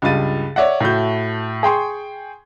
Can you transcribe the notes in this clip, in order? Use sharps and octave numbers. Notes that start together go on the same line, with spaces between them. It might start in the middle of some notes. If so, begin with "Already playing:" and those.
C#2 G2 F4 A6 D#7
C#5 D5 E5 F#5
A2 A3 F#4 G6
G#4 G5 C6 C#6